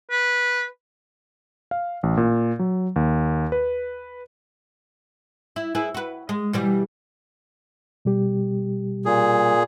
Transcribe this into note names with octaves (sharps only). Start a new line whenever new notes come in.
B4
F5
A1
A#2
F#3
D#2
B4
E4
E4 G#4 B4
F#4 B4
G#3
B2 E3 G3
B2 G3 G4
A#2 G#4